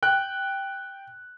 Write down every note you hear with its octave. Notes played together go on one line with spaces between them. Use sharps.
G5 F#6